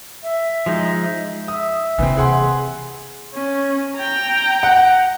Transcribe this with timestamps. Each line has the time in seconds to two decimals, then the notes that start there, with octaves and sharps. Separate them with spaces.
0.23 E5
0.66 F3 G#3 D#4
1.48 E5 D#6
1.98 C3 E3 A#3 C4
2.17 G#4 F#5 C6
3.34 C#4
3.96 G5 A#5
4.63 F#5